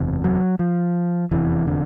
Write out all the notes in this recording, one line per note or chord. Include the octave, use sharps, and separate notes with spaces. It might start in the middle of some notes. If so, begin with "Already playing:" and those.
Already playing: F#1 E2 C3
F#3
F3
F1 E2 C3 E3
D3